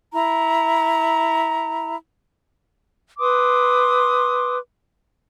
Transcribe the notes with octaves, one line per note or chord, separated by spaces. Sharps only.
E4 A#5
B4 C6 D6 D#6